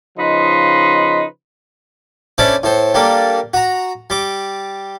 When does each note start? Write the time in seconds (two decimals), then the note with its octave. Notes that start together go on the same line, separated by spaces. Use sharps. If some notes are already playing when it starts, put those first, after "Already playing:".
0.17 C#3 F3 D#4 B4 D#5 C6
2.38 C#4 D4 E4 A4 C5 D5
2.63 A2 A4 C5
2.94 G3 A#3 D4 A4
3.54 F#4 A#5
4.10 G3 D6